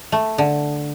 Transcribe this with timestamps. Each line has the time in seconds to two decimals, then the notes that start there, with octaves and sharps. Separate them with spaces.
0.12 A3
0.38 D3